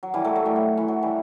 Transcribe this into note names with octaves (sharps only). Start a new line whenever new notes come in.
F#3
E3 G3
F#3 A3
F#3 A3
E3 G3
F#3
E3
F#3
E3 G3